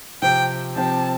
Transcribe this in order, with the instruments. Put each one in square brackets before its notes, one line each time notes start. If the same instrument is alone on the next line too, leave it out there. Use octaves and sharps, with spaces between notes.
[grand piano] C3 F3 C4 G4 [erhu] G5
[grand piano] C3 F3 C4 G4 [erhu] A5